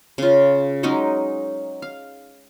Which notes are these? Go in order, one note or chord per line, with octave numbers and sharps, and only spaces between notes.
C#3 F4
F#3 G#3 C#4 D#4
F5